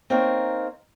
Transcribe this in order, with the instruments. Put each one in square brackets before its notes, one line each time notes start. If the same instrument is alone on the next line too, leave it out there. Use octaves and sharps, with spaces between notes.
[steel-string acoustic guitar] A#3 C4 D#4 A#4 C#5